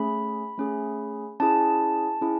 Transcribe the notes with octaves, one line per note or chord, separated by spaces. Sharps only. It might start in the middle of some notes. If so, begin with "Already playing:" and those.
Already playing: A3 C#4 G#4 B5
A3 C#4 G#4
C#4 E4 G#4 A5
C#4 E4 G#4